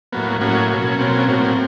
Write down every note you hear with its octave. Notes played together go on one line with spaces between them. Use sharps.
A2 F#3 A#3 B3
A2 F#3 A#3 C#4
B2 F#3 A#3
B2 F#3 A#3 C4
C#4
A2 F#3 A#3 C4